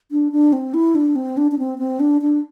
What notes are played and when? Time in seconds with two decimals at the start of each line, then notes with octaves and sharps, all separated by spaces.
0.12 D4
0.32 D4
0.53 C4
0.74 E4
0.95 D4
1.16 C4
1.37 D4
1.51 D4
1.59 C4
1.79 C4
2.00 D4
2.22 D4